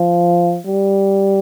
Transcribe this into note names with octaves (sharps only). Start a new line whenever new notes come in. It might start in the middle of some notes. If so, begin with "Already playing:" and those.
Already playing: F3
G3